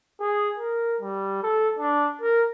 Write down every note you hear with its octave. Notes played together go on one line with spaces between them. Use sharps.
G#4
A#4
G3
A4
D4
A#4